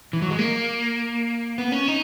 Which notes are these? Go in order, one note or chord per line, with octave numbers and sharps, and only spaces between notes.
E3
F#3
G#3
A#3
B3
C#4
D#4